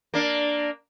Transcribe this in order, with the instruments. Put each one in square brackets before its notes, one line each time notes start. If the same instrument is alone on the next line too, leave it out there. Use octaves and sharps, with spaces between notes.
[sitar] A#3 D4